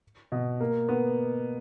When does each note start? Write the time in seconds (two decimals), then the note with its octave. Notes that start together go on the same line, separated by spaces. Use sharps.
0.32 B2
0.60 A#3
0.89 B3